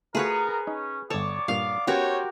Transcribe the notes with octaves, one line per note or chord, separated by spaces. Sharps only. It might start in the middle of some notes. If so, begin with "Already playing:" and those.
A3 B3 F4 F#4 G#4 A#4 B4 C#5
C#4 D#4
G1 B3 A4 C#5 D5 A5 D6
G2 A#2 F5
B3 C#4 F#4 G4 A#4 C5 C#5